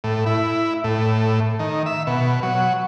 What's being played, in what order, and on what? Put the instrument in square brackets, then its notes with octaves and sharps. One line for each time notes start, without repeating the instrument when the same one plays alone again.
[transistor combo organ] A2
E4
A2
D#3
E5
B2
F#3